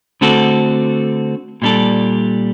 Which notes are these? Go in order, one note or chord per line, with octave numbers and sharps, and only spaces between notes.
D3 A3 C4 F#4 A4
A#2 G3 D4 A4